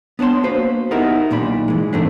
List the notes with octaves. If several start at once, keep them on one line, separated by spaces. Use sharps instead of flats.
B3 D4 C#5 A5 C6
A#3 F#4 B4 C5
B3 D#4 E4 G4 A#4
B1 A#2 D#3 D4 B5
B1 E3 G#3
G2 C3 D#3 A3 C4 D4